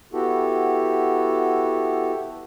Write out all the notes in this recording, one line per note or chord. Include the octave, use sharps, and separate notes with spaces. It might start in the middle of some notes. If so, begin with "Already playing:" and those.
B3 E4 F#4 G4 A4